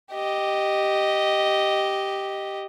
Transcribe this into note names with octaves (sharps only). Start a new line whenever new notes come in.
G4 D#5